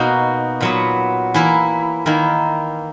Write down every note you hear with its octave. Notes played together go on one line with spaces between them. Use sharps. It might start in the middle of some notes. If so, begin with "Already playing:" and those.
Already playing: B2 A#3 D#4 F#4
A#2 F#3 B3
E3 A#3 E4
D#3 A#3 E4